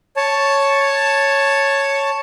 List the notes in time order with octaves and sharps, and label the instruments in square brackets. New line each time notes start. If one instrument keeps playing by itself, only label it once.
[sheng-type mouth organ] C#5 A5